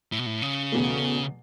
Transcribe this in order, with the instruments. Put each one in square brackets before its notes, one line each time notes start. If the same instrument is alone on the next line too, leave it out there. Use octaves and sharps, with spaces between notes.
[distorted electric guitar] A2
B2
A2
C#3
[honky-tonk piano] E2 B2 A3